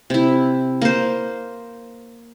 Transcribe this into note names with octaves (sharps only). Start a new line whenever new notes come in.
C3 E4
A#3 C5